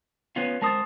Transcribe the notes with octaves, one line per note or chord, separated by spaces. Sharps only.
B3 C#4 F4
G#3 A#4 C5 A5 D#6 A6